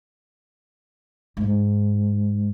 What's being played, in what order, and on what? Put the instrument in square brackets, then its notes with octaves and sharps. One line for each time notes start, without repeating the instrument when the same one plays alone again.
[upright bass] G#2